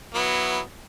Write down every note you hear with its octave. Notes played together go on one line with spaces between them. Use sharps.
F#3 B3 E4